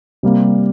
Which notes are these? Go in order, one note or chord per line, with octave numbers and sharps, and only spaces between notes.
C3 G3 A#3